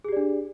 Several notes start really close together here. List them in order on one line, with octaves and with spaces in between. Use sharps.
G#4 G4 D5 D4